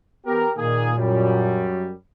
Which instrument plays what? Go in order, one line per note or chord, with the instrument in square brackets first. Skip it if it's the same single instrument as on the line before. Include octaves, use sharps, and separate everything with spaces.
[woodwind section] E3 B3 [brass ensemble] G4 A#4
[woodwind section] A#2 [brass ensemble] D#3 A#3 G#4
[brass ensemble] F#2 F#3 G3